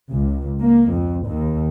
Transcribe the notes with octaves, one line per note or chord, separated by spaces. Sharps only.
C#2
A#3
F2
D#2